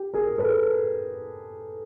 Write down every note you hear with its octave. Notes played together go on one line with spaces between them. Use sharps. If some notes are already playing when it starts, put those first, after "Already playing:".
Already playing: G4
G#4 A#4
A4 B4